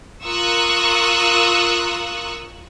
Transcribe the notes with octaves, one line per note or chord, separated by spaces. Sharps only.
F4 A#4 C#6 D#6 E6 F#6